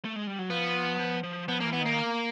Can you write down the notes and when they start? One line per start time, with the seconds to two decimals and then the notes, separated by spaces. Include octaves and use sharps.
0.05 A3
0.16 G#3
0.27 G3
0.39 F#3
0.50 F3 B3
0.99 F3
1.23 F3
1.48 F3 B3
1.61 A#3
1.65 E3
1.73 B3
1.81 D#3
1.86 A#3